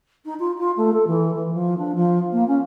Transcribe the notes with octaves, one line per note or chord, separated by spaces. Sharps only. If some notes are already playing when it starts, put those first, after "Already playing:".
D#4
F4
F4
A3
A4
E3
E3
F3
D4
F3
A#3
C#4